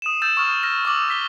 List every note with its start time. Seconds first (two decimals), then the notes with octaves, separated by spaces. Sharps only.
0.02 D#6 D#7 E7
0.22 E6 G6 A6 E7
0.37 C#6 D#6 F6
0.63 F6 A#6 E7
0.85 C#6 D6 E6 F#7
1.09 E6 B6 G7